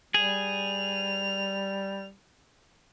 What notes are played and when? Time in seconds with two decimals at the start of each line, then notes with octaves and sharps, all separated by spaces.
0.14 G3 G#4 F7